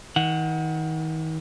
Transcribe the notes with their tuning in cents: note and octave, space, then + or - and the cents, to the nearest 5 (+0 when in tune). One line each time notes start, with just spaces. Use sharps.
D#3 +40 F#5 +0